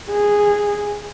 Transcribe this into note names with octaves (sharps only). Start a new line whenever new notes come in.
G#4